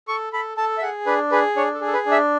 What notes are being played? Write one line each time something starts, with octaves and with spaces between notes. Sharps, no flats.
A4 C#6
A4 B5
A4 A5
E5
G#4 F#5
D4 B4
G#4 B4
D4 C#5
A4
G#4
A4
B4
D4
E5